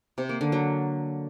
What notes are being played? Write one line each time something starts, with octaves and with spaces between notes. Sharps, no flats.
C3
A#3
D3
F#3